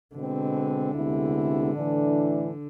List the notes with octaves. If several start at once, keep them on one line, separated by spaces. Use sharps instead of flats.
B2 D3 G#3 C4
D2 C3 G#3 B3 E4
A2 E3 A3 D4